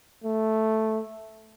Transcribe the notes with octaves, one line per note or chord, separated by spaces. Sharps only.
A3